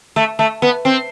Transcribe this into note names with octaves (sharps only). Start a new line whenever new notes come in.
A3
A3
B3
C4